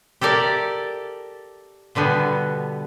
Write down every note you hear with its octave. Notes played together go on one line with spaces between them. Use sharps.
G4 A4 A#4 D5 E5
B2 D3 G3 B3